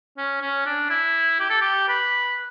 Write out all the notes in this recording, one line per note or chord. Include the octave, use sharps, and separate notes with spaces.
C#4
C#4
D4
E4
G4
A4
G4
B4